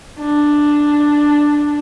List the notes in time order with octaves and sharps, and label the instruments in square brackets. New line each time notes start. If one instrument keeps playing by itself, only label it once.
[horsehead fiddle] D4